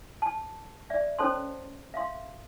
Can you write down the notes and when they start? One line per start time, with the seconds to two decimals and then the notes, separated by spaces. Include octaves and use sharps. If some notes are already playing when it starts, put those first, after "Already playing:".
0.22 A5
0.90 D5 E5
1.19 C#4 A4 C5 C#5 A5 C6
1.94 E5 F5 C6